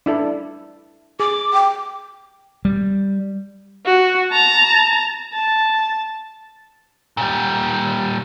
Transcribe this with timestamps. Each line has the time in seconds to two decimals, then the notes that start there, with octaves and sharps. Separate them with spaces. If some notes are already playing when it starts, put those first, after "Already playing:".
0.06 D4 E4 A4
1.20 G#4 D6
1.54 G5
2.65 G3
3.86 F#4
4.32 A5 A#5
5.34 A5
7.17 A#2 G3